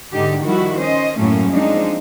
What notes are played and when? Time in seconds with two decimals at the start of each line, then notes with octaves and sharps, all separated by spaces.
0.12 G#2 D3 D#4 G4
0.43 D#3 F3 G3 E4 F#4
0.77 C#4 C5 D#5
1.16 F#2 A2 F#3 A3 A#3 C#4
1.49 F3 G#3 C4 D4 D#4